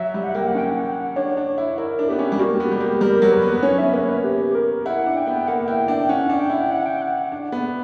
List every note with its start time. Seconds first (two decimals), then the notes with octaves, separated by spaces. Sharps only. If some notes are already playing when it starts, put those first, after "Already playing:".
Already playing: F#3 E5
0.14 G3
0.24 F#5
0.35 A#3 G5
0.47 F#5
0.55 C#4 G5
0.70 F#5
0.81 G5
0.92 F#5
1.16 D4 C#5
1.37 D4
1.58 E4
1.78 E4 A#4
1.99 D4
2.09 B3 G4
2.19 C#4
2.32 G3
2.39 A#3 F#4
2.55 G4
2.60 B3
2.71 G3 G4
2.81 A#3
2.86 G4
3.01 G3 A#4
3.22 F#3
3.32 B4
3.42 B3
3.53 B3
3.63 C#4 C#5
3.78 B3 E5
3.93 A#3 B4
4.04 C#5
4.09 B4
4.24 G4
4.50 G4
4.55 A#4
4.86 E4 F#5
5.06 D4
5.17 G5
5.27 B3
5.47 A#3 F#5
5.68 E4 G5
5.88 D4 G5
6.09 C#4 F#5
6.30 D4
6.40 G5
6.50 E4
6.71 F#5
6.86 G5
7.02 F#5
7.32 D4
7.52 B3